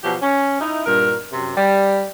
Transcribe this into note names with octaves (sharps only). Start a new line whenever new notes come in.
B2 F3 F#3 G4
C#4
D#4 E4
G2 A#2 A#4
F#2 C3
G3